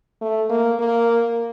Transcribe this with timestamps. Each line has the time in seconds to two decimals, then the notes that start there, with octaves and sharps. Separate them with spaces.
0.21 A3
0.50 A#3
0.79 A#3